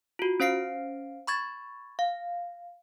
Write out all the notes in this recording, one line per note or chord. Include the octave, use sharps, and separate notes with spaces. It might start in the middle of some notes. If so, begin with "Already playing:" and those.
F4 F#4
C#4 C5 F5 C7 D7
B5 C#6 G#6 A6
F5